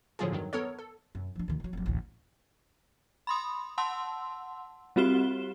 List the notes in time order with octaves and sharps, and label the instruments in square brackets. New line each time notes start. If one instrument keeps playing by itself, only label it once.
[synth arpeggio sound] A2 D3 F3 F#3 F4 G#4
E2 G2 D#3 F#3
B3 A4 A#4 C#5
A4
[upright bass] F#2
F3 D4
D2 D#3
F#3 G#3
F1 F#3
A1 D2
[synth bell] B5 C6 D#6
F#5 A5 C6 E6
G3 C4 F#4 G4 E7 G7